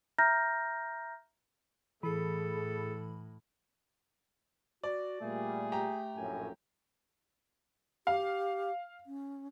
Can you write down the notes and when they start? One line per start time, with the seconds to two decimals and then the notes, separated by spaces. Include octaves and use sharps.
0.18 E5 A#5 F6 G6 A#6
2.03 A2 E3 G#4 A4 B5
4.84 F#4 D5
5.21 A#2 G3 A3 G#4
5.72 G4 A#5
6.17 A#1 F#2 A2 G#5
8.07 G4 F5
9.06 C#4